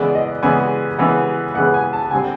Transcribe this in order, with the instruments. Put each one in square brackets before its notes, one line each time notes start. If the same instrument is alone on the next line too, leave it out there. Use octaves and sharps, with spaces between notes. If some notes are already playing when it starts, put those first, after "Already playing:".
Already playing: [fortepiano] C#3 E3 G#3 B3 D5
D#5
C#3 E3 G#3 B3 G#5
C#3 E3 G#3 B3
C#3 E3 G#3 B3 F#5
G#5
A5
D3 G3 C4 G#5